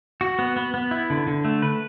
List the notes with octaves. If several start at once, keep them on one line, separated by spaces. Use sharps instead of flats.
F#4
B3
B3
B3
E4
D3
D3
A3
B4